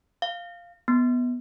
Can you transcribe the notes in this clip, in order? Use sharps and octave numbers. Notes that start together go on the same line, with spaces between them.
F5
B3